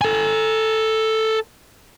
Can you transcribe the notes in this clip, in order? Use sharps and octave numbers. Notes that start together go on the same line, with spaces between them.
A4 G#5